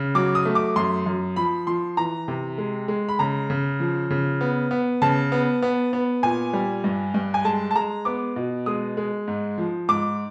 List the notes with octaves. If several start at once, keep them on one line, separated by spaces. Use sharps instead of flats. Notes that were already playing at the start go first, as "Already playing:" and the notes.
Already playing: C#3
F#3 D6
D#6
A3
D6
F#2 C6
F#2
F3 B5
F3 C6
E3 A#5
C3
G#3
G#3
B5
C#3 A#5
C#3
F3
C#3
B3
B3
C#3 A5
B3
B3
B3
A#2 G#5
G3
G2
G2
G#5
G#3 A5
A5
G#3 A#5
B3 D6
B2
G#3 D#6
G#3
G#2
F3
G#2 D6